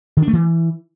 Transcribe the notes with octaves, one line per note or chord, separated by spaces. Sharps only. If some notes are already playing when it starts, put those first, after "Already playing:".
D#3
D4
A3
E3